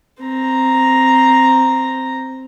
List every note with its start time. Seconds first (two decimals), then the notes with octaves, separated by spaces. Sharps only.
0.22 C4 A#5